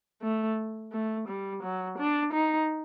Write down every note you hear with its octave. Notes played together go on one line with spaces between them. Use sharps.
A3
A3
G3
F#3
D4
D#4